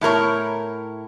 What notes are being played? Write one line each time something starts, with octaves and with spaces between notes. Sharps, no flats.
A2 E4 A#4 C#5